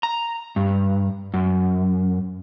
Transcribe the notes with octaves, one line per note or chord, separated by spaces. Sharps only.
A#5
G2
F#2